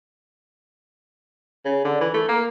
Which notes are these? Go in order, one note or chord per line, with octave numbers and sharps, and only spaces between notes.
C#3
D3
E3
A3
A#3